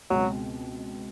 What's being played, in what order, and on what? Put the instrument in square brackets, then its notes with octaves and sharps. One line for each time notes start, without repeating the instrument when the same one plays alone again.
[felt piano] C#2 B2 G#3 C4 [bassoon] F#3